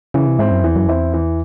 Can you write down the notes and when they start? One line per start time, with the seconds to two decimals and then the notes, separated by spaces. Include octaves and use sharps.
0.14 C#3 E3
0.27 C3
0.39 G#2 C4 E4
0.51 F#2
0.63 E2 E3
0.76 F#2
0.87 E2 C4 E4
1.14 E3